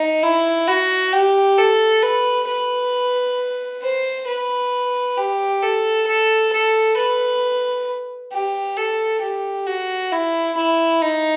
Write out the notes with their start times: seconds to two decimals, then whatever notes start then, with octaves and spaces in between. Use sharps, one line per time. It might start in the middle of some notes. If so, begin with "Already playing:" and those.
Already playing: D#4
0.23 E4
0.68 F#4
1.13 G4
1.58 A4
2.03 B4
2.47 B4
3.82 C5
4.27 B4
5.17 G4
5.63 A4
6.07 A4
6.52 A4
6.97 B4
8.32 G4
8.77 A4
9.22 G4
9.67 F#4
10.12 E4
10.57 E4
11.02 D#4